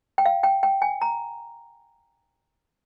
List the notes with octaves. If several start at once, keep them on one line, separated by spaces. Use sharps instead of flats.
G5
F5
G5
G5
G#5
A#5